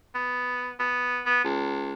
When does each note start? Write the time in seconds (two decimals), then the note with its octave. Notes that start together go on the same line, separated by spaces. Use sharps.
0.15 B3
0.80 B3
1.26 B3
1.45 C#2